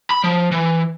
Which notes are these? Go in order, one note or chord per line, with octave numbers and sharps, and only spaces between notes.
B5
F3
E3